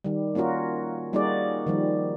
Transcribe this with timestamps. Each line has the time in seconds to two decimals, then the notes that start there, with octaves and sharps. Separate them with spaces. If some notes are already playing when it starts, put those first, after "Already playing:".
0.04 D#3 G3
0.35 A#3 C#4 F4 F#4 A#4
1.13 G3 A#3 D#4 F#4 G#4 D5
1.67 D#3 F3 G3